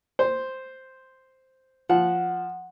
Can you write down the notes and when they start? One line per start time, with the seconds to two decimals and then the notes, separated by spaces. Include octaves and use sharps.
0.19 C5
1.89 F3 F#5